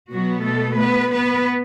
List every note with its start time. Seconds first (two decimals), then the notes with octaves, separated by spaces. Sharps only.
0.11 B2 F#3 B3 F#4
0.45 A3 A4
0.78 B3 B4
1.13 B3 B4